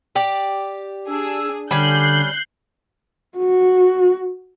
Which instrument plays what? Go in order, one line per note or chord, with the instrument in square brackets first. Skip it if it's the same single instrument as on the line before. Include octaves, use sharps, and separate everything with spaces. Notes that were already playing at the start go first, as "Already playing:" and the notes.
[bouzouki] G4 D5
[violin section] D4 G#4 [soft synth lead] E6
[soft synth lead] D3 [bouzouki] G3 C#4 [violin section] F#6 G6 C7
[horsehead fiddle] F#4